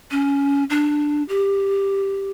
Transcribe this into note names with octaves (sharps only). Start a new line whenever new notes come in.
C#4
D4
G4